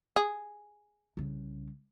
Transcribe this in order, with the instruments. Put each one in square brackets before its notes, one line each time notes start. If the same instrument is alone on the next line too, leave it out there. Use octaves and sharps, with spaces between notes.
[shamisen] G#4
[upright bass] C2 C#3